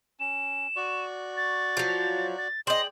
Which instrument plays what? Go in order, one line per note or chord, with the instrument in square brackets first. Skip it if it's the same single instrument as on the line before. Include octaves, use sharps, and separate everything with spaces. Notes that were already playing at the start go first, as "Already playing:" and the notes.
[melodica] C#4 [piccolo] E7
[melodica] F#4 D5 C#6
[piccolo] A6
[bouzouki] F3 F#3
[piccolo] A6
[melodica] G#4 D5 G5 [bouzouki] C5 D#5 [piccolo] F#7